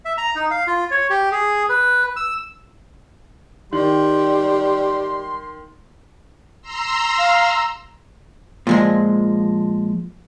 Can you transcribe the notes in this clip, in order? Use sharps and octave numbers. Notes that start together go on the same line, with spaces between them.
E5
A#5
D#4
F5
F4
C#5
G4
G#4
B4
E6
D#3 G3 C6
A#5 C6 E6
F5
A#2 F3 G#3